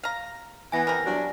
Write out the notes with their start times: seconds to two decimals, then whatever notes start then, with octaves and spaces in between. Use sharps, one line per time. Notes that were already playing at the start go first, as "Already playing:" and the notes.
0.03 F5 A#5
0.72 E3 B3 G#5 A#6
0.87 C3 A#4
1.05 F#3 G3 D4